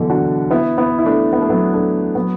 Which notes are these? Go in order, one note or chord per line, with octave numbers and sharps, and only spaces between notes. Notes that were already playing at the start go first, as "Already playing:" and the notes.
Already playing: B2 D3 E3 F#3
D4 F#4
B3 E4
B3 E4
E4
A3 D4
B3
A3
F#3 B3
A3 D4
F#3 B3